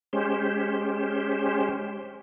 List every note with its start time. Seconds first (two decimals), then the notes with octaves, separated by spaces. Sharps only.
0.13 G#3 C#4 G4 C5